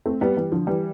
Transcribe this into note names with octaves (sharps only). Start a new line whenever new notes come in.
A3 C4
G3 B3
E3 G3
D3 F3
E3 G3